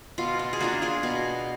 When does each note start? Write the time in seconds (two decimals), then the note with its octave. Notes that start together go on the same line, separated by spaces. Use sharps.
0.18 B2 F4
0.39 F4
0.53 G#4
0.60 A#3 D4 F4 F#4
0.82 F4 G#4
1.03 B2